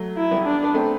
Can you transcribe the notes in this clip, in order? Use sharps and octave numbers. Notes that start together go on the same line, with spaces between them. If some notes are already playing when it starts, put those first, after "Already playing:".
Already playing: F#3 A3
E4
G3 B3
D4
B3
A3 C4